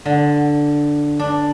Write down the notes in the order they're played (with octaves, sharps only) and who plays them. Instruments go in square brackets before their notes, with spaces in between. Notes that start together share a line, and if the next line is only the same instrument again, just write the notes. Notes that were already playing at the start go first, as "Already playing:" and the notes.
[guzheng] D3
D4